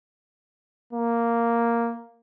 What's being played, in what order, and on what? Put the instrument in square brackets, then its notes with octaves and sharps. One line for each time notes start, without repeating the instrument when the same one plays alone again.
[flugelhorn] A#3